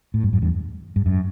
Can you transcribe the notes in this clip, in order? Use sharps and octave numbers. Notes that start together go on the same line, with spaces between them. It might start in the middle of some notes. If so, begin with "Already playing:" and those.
A2
G2
F#2
E2 G2
G2
F#2